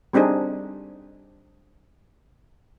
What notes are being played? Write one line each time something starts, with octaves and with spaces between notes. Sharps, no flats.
G3 C4 D4 D#4 G#4